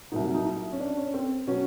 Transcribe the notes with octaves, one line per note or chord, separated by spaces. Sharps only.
C2 A#2 F#3 D#4
D#4
E4
C#4
D4
C#4
C4
B2 F#3 C#4